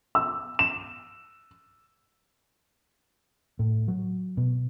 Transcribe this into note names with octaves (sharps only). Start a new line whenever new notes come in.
E6
E7
A2
F#3
B2